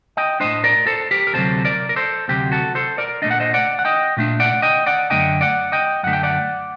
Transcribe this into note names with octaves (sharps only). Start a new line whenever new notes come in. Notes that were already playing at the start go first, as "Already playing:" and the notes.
D#5 G5
A2 A3 D4 C5 D#5
A#4 D5
A4 C5
G4 A#4
A#4
D2 C3 F#3 A4 C5
A#4 D5
A#4
A4 C5
D2 C3 F#3 G4
F#4 A4
A4 C5
A#4 D5
A#2 A3 D4 D#5
F#5
C5 D#5
D5 F#5
F#5
D#5 G5
A#2 A3 D4
D5 F#5
D#5 G5
D5 F#5
F#2 D3 A3 D#5 G5
D5 F#5
D#5 G5
F#2 D3 A3 F#5
G5
D5 F#5